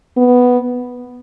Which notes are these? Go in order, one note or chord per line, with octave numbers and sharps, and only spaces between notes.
B3